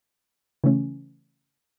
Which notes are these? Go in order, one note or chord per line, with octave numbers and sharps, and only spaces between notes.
C#3 E3 A3 C#4